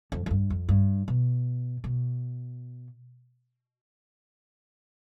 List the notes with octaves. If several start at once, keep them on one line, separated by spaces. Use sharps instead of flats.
F2
F2
G2
F2
G2
B2
B2